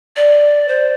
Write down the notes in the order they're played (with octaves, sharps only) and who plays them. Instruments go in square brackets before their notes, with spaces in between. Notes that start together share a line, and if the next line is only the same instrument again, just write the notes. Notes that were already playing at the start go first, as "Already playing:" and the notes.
[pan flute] D5
C5